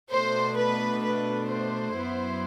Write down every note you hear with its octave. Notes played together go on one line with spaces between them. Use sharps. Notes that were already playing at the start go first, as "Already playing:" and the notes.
B2 A3 D4 C5
B4
B4
C5
F#2 F#3 B3 E4